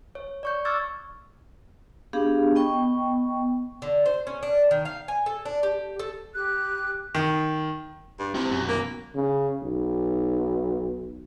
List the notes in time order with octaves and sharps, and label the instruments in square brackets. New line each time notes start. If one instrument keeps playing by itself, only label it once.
[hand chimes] C#5
D5 C#6 G6
C#6 D6 E6 F6 G#6 A6
[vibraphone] B3 D4 G4 G#4 F5
B3 D#5 G5 C#6
[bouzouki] D3
C5
C#4
D4
D#3
F5
G#5
A4
D4
G4
A4
[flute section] G4 F#6
[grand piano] D#3
[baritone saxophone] G2
[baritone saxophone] C3 [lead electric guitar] E4 G4
[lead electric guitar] F#2 B2
[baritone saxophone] A#3
[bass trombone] C#3
B1